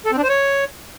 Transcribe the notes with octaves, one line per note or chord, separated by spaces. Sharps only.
A4
C4
D4
C5
C#5